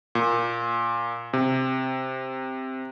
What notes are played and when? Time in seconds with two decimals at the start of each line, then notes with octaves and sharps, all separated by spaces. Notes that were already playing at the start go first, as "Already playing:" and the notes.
0.15 A#2
1.33 C3